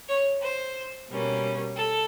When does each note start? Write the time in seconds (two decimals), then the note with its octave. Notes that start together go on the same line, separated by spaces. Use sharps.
0.08 C#5
0.41 C5
1.09 B2 G3 A#3 C#4
1.76 A4